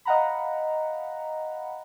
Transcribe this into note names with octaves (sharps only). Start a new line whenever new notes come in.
D#5 F5 F#5 A#5 B5